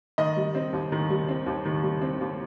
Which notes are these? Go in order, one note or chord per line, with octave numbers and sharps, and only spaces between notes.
D#3 D#5
G3
C4
D#2
D#3
G3
C4
D#2
D#3
G3
C4
D#2